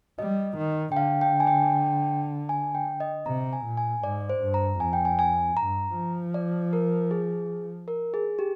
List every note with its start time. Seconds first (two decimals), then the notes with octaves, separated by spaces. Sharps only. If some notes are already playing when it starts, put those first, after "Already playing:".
0.19 G3 D#5
0.58 D#3
0.92 G5
0.96 D3 F5
1.21 G5
1.40 G#5
1.47 G5
2.49 G#5
2.75 G5
3.00 D#5
3.26 C3 A#5
3.53 G#5
3.65 A#2
3.77 G#5
4.03 G#2 D5
4.29 C5
4.42 G2
4.54 A#5
4.80 F2 G#5
4.93 G5
5.05 G#5
5.19 G#5
5.57 G2 A#5
5.95 F3
6.34 D5
6.73 A#4
7.11 G#4
7.88 A#4
8.14 G#4
8.39 G4